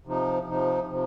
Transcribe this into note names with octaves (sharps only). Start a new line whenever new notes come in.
C3 F3 D#4
C3 F3 D#4
C3 F3